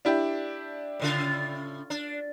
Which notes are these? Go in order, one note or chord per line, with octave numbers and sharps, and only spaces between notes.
D4 E4 G4
A2 C#3 F4
D4